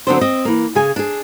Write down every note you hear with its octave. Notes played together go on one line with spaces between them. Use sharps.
D3 F#3 B3 C4 D4 C5
C4 D#5
E3 A#3
C#3 G#4 G#5
D4 G#4